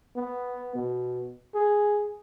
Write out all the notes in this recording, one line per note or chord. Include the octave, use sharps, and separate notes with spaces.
B3
B2
G#4